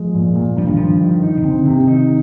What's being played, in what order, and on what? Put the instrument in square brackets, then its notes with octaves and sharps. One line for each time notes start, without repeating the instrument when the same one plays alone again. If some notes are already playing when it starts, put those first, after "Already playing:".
Already playing: [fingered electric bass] F3 [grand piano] G#3
[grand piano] A#2
A#2
[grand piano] G2 [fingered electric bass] F3
[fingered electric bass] D#3
[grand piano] G2 [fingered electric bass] F3
[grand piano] D#3
D#4
[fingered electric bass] C3
[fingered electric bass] D3 [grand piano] C4
[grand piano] C3 [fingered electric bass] D#3
[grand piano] D#4